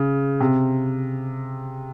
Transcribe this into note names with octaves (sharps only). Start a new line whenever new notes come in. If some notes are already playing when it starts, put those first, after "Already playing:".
Already playing: C#3
C3